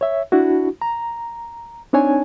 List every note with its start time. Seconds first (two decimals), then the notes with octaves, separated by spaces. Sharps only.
0.01 C#5 E5
0.32 D4 E4 F#4
0.82 A#5
1.93 C4 D4 D#4 C#5 G#5